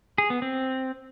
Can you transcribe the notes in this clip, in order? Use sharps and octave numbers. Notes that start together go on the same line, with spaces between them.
G#4
B3
C4